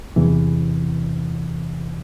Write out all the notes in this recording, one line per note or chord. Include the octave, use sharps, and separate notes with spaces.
E2 C3 E3